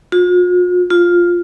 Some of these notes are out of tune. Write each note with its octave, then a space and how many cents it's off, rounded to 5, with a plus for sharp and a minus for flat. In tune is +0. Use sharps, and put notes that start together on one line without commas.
F4 +45
F4 +5